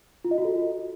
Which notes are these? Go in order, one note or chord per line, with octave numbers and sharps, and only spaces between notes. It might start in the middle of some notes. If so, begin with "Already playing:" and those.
F4
D#5
F#4
A4